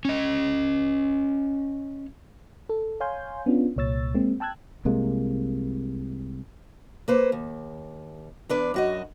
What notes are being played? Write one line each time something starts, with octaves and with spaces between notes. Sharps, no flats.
C#4 D#5
A4
C#5 F5 G#5 C6 G6
B3 C#4 D4 F4
C2 A#2 C#5 E6 A6
G#3 A#3 C4
G5 A5 E6 F#6 G#6
C2 C3 G#3 A#3
A#3 B4 C5
D#2
E2 D4 B4
F#2 F#4 D#5